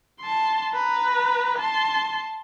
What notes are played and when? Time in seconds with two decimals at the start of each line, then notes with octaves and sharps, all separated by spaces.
0.20 A5 C6
0.74 B4 A#5
1.59 A5 C6